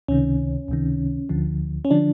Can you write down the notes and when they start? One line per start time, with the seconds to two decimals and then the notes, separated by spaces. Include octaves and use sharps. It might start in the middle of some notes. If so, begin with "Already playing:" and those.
0.08 C#2 C3 D#3 C#4
0.68 C#2 C3 D#3
1.29 D2 D3 F3
1.85 C#4
1.91 D3 F3 D4